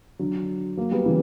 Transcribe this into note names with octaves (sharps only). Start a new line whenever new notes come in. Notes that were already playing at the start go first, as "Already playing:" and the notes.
D3 F#3
F#3 A#3
G3 B3
C#3 E3